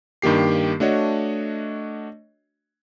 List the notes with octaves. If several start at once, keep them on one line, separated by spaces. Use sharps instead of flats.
G2 D#3 A#3 G4 C7
A3 D4 F#4 C#5 D#5